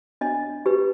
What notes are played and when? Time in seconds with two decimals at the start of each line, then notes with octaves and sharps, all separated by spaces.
0.21 D4 D#5
0.66 G4 B4